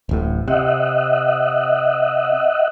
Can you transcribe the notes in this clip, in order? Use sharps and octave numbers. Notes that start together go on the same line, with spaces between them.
D1 A1 A2
C3 D#5 E5 F#5